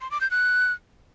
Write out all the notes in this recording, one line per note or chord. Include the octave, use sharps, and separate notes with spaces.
C6
D6
G6
F#6